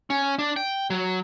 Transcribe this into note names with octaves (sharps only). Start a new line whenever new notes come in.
C#4
D4
G5
F#3